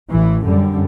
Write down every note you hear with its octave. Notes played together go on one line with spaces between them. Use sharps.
A1 E3
F#2 D3 G3